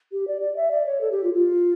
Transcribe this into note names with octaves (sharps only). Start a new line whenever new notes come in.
G4
D5
D5
E5
D5
C#5
A4
G4
F4
F4